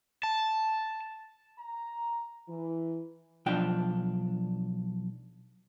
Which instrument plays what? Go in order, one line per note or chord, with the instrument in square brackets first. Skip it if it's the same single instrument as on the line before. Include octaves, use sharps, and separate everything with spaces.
[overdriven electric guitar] A5
[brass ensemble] A#5
E3
[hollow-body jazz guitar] B1 F3 D4 G5